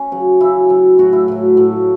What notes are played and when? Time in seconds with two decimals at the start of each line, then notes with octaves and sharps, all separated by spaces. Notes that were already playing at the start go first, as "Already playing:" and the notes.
Already playing: C#4
0.12 C#3 F#3
0.40 C#3 F#3 E4
0.69 C#3 F#3
0.98 A2 F#3 F#4
1.13 E4
1.28 A2 F#3
1.57 A2 F#3